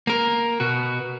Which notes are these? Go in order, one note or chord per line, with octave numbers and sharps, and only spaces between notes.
A#3 A#4
B2 F#4